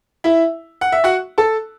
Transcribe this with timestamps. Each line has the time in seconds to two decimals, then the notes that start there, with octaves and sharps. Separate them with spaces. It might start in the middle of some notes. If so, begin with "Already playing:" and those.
0.24 E4 E5
0.81 F#5
0.92 E5
1.04 F#4 F#5
1.38 A4 A5